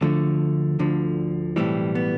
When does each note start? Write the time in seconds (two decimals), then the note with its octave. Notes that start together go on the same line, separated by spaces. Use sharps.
0.01 D2 D3 F3 A3
0.79 D2 D3 F3
1.56 B1 A2 E3 G3 C4
1.95 B3